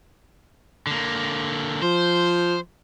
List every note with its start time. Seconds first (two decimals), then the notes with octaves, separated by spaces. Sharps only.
0.87 D3 A#3
1.82 F3 C5